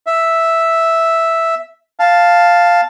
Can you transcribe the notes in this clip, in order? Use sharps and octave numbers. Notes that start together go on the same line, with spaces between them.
E5
F5 A5